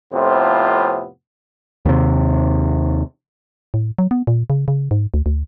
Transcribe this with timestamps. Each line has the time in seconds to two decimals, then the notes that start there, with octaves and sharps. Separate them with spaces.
0.14 F2 A2 C3 B3 F4 C5
1.86 D#2 C3
3.74 A2
3.98 F#3
4.11 B3
4.27 A#2
4.50 C#3
4.68 C#3
4.91 G#2
5.14 D2
5.26 D2